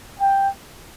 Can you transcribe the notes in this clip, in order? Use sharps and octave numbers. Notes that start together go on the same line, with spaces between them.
G5